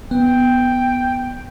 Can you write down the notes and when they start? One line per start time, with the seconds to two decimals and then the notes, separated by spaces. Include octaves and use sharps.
0.11 B3 G5